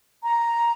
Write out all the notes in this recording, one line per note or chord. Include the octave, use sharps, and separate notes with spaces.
A#5